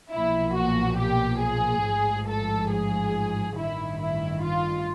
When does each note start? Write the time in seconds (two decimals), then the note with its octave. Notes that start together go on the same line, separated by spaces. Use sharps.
0.12 B1 A#2 F3 E4
0.55 F#4
0.99 G4
1.42 G#4
1.85 A1 G#2 F3
2.29 A4
2.72 G#4
3.57 A1 G2 D#3 E4
4.01 E4
4.44 F4